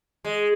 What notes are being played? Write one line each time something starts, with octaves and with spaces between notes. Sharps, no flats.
G#3